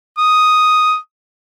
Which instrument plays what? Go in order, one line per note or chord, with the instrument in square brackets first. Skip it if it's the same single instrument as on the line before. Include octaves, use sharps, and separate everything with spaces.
[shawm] D#6